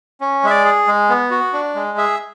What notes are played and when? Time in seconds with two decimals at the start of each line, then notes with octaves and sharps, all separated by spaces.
0.21 C#4
0.44 G#3 E5
0.50 D5
0.65 G#4
0.87 G#3
1.10 B3
1.31 F#4
1.53 D4
1.75 G#3
1.98 G#4 E5